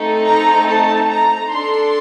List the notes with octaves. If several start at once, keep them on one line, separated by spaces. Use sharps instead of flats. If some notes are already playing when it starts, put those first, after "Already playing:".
Already playing: A3 C4 D#4 A4
A#5
A5
A#5
D4 A4 C6